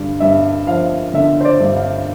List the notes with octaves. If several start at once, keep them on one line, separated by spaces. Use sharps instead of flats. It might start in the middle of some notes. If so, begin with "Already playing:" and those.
Already playing: G2 D3
G2 E5
F3 F5
D3 E5
C5
D5
G2
F5